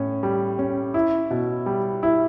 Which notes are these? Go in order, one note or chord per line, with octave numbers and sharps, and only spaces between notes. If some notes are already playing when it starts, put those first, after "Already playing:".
Already playing: A2 C#4
G3
C#4
E4
B2
G3
E4